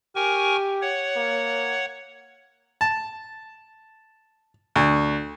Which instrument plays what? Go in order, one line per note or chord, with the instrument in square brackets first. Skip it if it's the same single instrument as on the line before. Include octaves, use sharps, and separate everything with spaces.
[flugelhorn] G4 [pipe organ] A#4 G#5 C#6
[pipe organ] C#5 F#5
[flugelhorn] A#3
[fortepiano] A5
D2